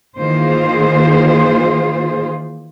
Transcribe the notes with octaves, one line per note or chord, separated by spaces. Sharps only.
D#3 E3 A#3 F4 G#4 C5